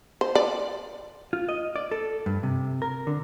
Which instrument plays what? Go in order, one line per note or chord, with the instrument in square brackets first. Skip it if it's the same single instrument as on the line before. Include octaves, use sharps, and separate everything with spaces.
[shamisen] C5
D5
[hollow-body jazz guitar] F4
D#5
D5
A4
G2
C3
A#4
D3